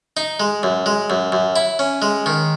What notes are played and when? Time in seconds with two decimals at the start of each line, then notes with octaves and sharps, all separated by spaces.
0.17 D#4
0.40 G#3
0.63 F#2
0.86 G#3
1.10 F#2
1.32 F#2
1.56 E4
1.79 C#4
2.02 G#3
2.26 D#3